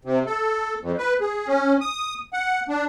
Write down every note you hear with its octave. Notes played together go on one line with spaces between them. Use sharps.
C3
A4
F2
B4
G#4
C#4
D#6
F#5
D4